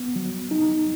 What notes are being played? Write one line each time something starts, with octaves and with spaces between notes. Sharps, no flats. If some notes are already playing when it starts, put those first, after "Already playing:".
Already playing: B3
F#3
D#4